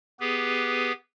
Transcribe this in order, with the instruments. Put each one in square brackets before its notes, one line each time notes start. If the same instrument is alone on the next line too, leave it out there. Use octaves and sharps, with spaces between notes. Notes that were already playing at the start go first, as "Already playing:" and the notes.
[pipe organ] B3 G4 G#4 B4